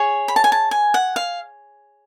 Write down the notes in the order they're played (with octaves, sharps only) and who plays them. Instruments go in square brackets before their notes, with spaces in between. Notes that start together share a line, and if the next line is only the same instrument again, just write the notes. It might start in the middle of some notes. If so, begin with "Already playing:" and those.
Already playing: [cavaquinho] G#4 C#5 C#6
B5
A5
G#5
A5
G#5
F#5
F5